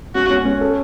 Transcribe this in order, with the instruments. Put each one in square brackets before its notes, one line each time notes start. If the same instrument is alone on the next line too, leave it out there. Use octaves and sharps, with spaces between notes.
[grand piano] C#4 [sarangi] F#4
[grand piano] C#4
C#4
A4